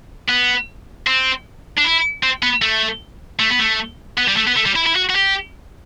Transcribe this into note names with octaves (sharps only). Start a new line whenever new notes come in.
B3
C4
D4
E4
C4
B3
A3
A3
B3
A3
B3
G3
A3
B3
A3
G3
E4
E4
F#4
F#4
G4